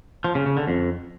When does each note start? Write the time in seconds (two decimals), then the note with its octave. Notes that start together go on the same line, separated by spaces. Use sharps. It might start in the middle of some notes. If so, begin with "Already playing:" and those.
0.24 F3
0.35 C#3
0.46 C#3
0.57 D3
0.68 F2